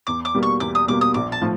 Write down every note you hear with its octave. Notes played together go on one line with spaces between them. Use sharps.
E2 D6
D6
B2 G3 A#3
C#6
E2 D6
D#6
B2 G3 A#3 D6
D#6
A#1 D6
A5
A2 F3